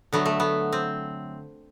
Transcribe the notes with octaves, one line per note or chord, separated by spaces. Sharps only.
D3 F#3 A3 B3
A3
B3
C4